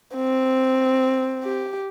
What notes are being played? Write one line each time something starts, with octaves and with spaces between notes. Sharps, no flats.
C4
G4